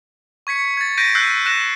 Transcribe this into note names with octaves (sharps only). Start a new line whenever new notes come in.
C#6 G#6 B6 C#7
G#6 A6
G6 A#6 B6 D7 D#7
E6 F#6 G6 B6 C7
F#6 A#6 D#7 E7